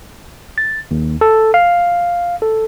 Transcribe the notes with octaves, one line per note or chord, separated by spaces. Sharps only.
A6
D#2
A4
F5
A4